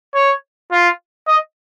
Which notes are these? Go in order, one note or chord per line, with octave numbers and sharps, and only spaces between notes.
C#5
F4
D#5